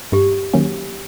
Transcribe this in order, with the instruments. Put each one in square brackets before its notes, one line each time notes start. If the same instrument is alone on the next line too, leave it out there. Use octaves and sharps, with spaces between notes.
[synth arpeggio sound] G2 [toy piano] G4
[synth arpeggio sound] D#3 F#3 A#3 C#4